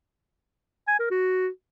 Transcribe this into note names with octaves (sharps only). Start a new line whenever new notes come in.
G#5
A#4
F#4